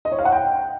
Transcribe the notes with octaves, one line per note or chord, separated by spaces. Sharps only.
D#5
C#5
F5
F#5
G5